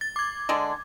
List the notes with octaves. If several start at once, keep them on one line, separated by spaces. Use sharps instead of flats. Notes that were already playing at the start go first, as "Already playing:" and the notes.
A6
D6 G#6
D3 G#3 D4